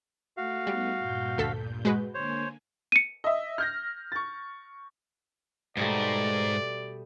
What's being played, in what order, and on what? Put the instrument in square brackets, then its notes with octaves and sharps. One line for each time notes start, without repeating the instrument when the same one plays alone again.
[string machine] A3 [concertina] F#4 F5
[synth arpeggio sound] G3 [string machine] A3 B3 D#4
[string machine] G2 A#2 G6
[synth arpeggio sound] D2 A4 B6
G#3 F#4 B4
[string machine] D3 A#3 G#5 [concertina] C5 C#5
[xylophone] C#7 D#7
[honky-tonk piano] D#5 E5
F6 G6 A#6
C#6 A6
[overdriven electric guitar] G#2 [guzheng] B2 G3 A3 [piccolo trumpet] D5